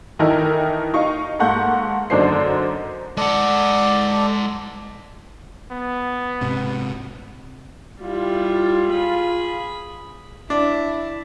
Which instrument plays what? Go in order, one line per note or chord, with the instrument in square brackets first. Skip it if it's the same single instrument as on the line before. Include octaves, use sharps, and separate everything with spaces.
[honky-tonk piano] D#3 E3 D#4 E4 A4 A#4
D#4 F5 C#6
G#2 A#3 A4 F#5 C#6 G6
F#2 D3 D4 D#4 C5 C7
[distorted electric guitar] G#3 F#5 [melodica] A4 D5
[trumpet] B3
[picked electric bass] G#2 C3
[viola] G3 E4 [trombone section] F4
[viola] G#4 B5
[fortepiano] D4 [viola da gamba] E4